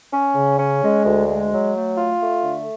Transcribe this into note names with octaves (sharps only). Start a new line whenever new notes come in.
C#4
C#3
C#4
G#3
D2
G#3
F#3
A3
F4
A3
D3